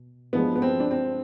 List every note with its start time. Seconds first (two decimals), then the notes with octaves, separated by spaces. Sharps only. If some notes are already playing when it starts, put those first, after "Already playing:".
Already playing: B2
0.33 G2 F3 G#3 B3
0.56 B3
0.62 C4
0.80 D4
0.91 C4